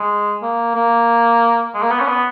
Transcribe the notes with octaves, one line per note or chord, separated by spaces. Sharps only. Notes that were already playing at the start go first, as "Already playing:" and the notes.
Already playing: G#3
A#3
A#3
G#3
A#3
B3
C#4
B3